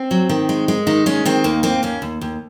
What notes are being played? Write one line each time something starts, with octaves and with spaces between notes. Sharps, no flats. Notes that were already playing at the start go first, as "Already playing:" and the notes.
Already playing: C4
F#3
D#3
G#3
G#3
D#3 D#4
G#3 C#4
D#3 C4
D#2 A#3
A#3 C4
D#2 C#4
D#2
D#2